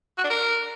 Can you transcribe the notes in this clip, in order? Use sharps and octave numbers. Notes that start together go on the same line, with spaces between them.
F#4
D4
A#4